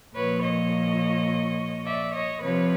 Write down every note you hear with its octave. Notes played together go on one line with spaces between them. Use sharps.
A#2 F3 B4 C#5
C#5 D#5
D5 E5
C#5 D#5
C3 F3 B4 C#5